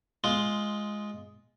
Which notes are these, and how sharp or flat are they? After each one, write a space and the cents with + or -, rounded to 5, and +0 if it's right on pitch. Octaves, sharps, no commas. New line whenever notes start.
G#3 +5 F4 +0